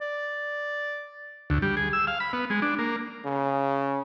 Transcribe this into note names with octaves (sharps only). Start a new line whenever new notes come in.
D5
D2
G3
G#4
E6
F5
B5
B3
G#3
D4
A#3
C#3